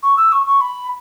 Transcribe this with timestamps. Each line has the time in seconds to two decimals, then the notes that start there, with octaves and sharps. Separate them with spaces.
0.03 C#6
0.17 E6
0.32 C#6
0.46 C#6
0.61 B5